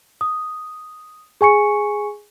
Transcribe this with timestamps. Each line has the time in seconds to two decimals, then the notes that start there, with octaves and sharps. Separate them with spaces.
0.21 D#6
1.41 G#4 G#5 C#6 C#7